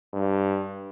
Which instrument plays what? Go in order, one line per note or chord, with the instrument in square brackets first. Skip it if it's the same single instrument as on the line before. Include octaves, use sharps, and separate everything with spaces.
[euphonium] G2